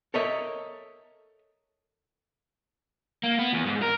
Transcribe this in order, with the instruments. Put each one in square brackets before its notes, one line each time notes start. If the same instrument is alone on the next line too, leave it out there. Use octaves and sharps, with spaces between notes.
[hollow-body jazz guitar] A4 A#4 C#5 D#5 E5
[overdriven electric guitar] A#3
B3
E2
G#2
A#4